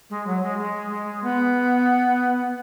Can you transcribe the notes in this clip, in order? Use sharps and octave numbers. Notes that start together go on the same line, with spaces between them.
G#3
F#3
G#3
G#3
G#3
B3